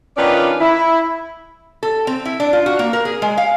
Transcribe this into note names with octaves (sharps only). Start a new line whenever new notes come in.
D#3 C#4 D4 F4 B4 D5
E4
A4
C4
E4
D4
F4
F#4
A#3
A#4
G#4
G#3
F5